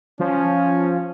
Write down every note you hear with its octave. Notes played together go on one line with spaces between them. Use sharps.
F3 C#4